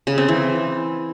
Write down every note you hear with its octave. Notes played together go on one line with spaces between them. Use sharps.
C#3
C4
E3